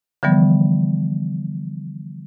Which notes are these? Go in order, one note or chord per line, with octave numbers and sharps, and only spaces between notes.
D3 E3 F3 G3 B3